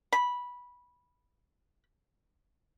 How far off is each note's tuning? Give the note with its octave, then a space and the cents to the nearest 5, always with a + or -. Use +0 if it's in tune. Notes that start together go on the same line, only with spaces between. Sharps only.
B5 -10